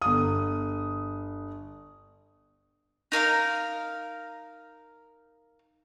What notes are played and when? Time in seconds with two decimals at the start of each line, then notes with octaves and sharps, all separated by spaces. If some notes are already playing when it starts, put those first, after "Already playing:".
0.02 G1 D#6
3.12 D#4 A#4 F5 A#5